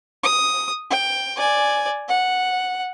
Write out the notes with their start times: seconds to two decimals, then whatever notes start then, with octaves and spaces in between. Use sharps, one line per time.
0.23 D#6
0.90 G5
1.36 D5 G#5
2.08 F#5